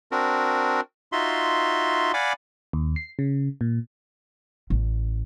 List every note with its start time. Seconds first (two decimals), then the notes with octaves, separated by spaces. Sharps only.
0.12 C4 D4 F#4 A#4
1.12 D#4 F4 F#4 E5 C6
2.14 D5 F5 F#5 G#5 B5 D6
2.73 D#2
2.96 C7
3.19 C#3
3.61 A#2
4.70 A1